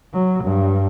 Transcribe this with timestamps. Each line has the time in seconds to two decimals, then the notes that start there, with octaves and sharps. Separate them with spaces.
0.13 F#3
0.44 G2